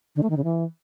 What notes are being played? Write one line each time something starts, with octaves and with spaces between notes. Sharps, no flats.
D3
A3
D#3
C#3
E3